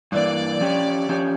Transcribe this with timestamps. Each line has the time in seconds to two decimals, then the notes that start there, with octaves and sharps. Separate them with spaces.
0.12 G2 E3 A#3 D5
0.61 F3 C#4 G4 C#5
1.09 F3 C#4 G4 C#5